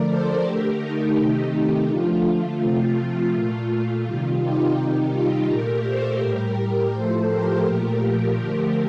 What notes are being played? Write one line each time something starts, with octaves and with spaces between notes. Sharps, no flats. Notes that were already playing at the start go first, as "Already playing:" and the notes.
Already playing: D3 F3 A3 A#4 D5
A4 C5
D3 A3 G4 A#4
D#4 G4
C3 D#3 A3
D3 F3 A3 F4
F4
C3 F3 A3
A#2 A3
F4
C3 D#3 G3
D#4 G4
C3 D#3 G3
F4
A#2 A3 G4 A#4
A4 C5
A2 G3 G4 A#4
A2 F3 A3 A4 C5
G4 A#4
A#2 F3 A3
G4 A#4
D3 F3 A3